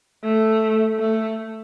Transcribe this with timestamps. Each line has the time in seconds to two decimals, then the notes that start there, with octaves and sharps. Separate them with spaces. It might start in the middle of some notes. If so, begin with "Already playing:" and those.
0.24 A3
0.99 A3